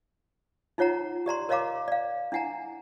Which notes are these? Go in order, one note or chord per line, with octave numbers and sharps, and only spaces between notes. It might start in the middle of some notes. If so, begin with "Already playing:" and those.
D#4 F4 C#5 F#5 A#5
G4 D5 A#5 C6
A#4 C#5 D#5 F5 A#5 D6
D5 F5
D4 E4 F#5 G#5 A#5